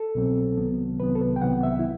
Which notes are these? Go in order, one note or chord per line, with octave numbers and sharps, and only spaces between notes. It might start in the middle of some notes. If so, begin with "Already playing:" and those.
Already playing: A4
C2 B2 F#3 C4
C2 C3 D#3 F#3 B3
C2 C3 D#3 F#3 B3 B4
A4
B4
G5
C2 C3 D#3 F#3 B3 F#5
E5
E4